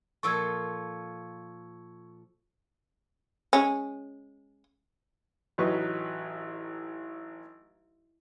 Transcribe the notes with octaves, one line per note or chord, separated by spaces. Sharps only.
A#2 F3 A4 C#6 E6 G#6
G#3 C#4
A1 F#3 D#4 B4 D#5 C#6